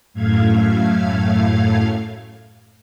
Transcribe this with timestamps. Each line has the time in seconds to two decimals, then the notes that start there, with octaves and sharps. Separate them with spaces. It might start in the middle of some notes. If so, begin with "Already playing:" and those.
0.14 F#2 A2 A3 F5 G#6